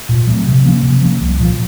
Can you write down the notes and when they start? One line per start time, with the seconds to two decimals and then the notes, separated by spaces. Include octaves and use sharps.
0.09 A#2
0.27 F#3 A3 C4
0.45 C3
0.65 F3 A#3 C#4
0.83 C3
1.01 F3 A#3 C#4
1.20 C2
1.39 A#2 F3